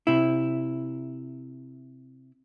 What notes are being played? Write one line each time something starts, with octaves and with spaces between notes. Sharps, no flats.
C3 E4